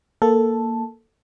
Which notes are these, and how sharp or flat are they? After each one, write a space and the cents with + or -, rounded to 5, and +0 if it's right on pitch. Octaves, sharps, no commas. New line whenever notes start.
A#3 -5 A4 +0